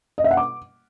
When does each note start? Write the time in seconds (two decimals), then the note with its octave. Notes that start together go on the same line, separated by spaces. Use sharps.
0.18 D#5
0.24 E5
0.31 F#5
0.37 D6